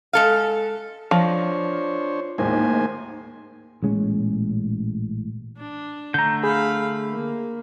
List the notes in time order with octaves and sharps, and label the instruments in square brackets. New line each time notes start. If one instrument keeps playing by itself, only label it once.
[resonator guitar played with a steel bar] G#3 A4 F5
[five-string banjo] F3 [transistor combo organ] D4 C5 C#5 [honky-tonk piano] A#6
[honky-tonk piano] A1 D#2 G#2 [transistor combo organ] A#3 C5 G#5
[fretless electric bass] A1 A#2 G#3 C#4
[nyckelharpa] D4
[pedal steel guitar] D3 A3 [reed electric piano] A#5 G6
[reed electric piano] G#4 [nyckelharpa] F5 B5
[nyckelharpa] A#3